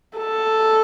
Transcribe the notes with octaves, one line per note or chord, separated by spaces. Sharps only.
A4